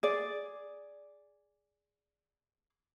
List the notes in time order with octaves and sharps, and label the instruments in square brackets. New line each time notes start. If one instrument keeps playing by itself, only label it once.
[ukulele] G#4 D5